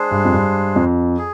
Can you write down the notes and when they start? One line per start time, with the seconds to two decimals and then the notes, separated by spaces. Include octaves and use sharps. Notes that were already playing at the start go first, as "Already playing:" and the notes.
Already playing: G#3 D4 G#4 C5
0.11 G2
0.25 F2
0.33 G2
0.76 F2
1.18 G#4